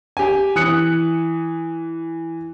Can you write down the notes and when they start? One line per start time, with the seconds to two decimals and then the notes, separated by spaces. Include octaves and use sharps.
0.17 G4 G#5
0.56 E3 D#6 F#6 C#7